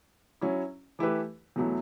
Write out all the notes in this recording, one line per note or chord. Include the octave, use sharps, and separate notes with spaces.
F#3 C#4 E4
E3 A3 E4 G4 B4
E2 B2 F#3 A3 E4